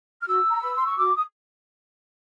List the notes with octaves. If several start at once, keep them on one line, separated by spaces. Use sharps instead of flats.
F6
F#4 E6
A#5
B4 B5
C6
C#6
F#4 D6
D#6